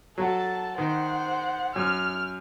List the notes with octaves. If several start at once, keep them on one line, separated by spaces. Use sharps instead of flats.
F#3 F#4 A4 A5
D#3 C5 F#5
F#2 F6